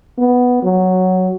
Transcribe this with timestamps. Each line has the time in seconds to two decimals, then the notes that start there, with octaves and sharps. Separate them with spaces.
0.18 B3
0.63 F#3